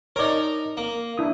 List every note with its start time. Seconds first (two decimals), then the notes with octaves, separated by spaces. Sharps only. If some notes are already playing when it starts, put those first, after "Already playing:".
0.16 D#4 A#4 C#5 D5
0.77 A#3
1.18 D4 E4 D#6